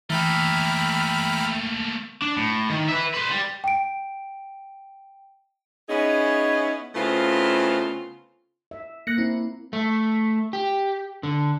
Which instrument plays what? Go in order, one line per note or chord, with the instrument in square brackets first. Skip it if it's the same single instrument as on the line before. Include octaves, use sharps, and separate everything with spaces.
[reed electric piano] E3 [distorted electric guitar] A3 A#3 [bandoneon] E5 A#5 [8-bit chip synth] G5 B5 F6
[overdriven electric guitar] D4
A2
D#3
B4 E5
B4 C5
G3
[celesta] G5 D7
[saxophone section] B3 C#4 D#4 E4 G#4
C#3 A3 B3 C4 E4 F4
[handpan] E5
[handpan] A#3 [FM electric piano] F#6 A#6 C#7
[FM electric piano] C4 [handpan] E4
[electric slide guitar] A3
G4
D3